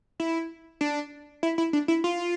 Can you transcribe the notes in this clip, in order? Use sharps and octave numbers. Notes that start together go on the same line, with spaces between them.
E4
D4
E4
E4
D4
E4
F4